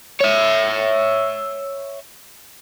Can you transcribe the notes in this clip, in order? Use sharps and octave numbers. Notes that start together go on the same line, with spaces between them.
C#5 E5